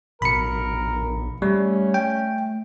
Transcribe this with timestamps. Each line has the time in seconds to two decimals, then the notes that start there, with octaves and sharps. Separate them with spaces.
0.22 A#1 B2 A#4 B5 C#7
1.42 G3 A3 C#4
1.94 G5